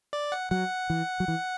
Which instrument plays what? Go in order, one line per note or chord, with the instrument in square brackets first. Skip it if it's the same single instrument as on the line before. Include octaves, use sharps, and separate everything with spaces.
[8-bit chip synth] D5
F#5
[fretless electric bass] F#3 [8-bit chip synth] F#5
[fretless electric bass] E3
F#3
E3